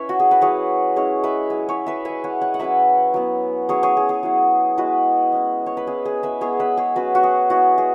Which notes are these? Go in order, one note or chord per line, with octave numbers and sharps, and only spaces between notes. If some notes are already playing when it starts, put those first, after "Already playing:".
Already playing: C#4 E4 B4 C#5 E5
F#4
G#4
B4
F#3 C#4 E4 G#4 C#5
G#3 C#4 E4 G#4 C#5
B4 E5
F#3 E4 G#4
G#4 C#5
B4 E5
G#3 E4 E5 G#5
C#5 F#5
C#5 F#5
F#5
F#3 C#4 E4 B4 E5
F#3 B3 E4
F#3 C#4 E4 G#4 C#5
G#4 C#5
G#4
G#4
F#3 B3 E4
G#3 B3 E4 F#4 B4
G#3 C#4 E4
C#5
B4
G#3 C#4 E4 G#4
G#4
B4 E5
G#3 B3 E4 G#4 C#5
B4 E5
G#4 C#5
F#3 C#4 E4 F#4 B4
F#4
G#4
G#3 B3 E4 F#4
G#4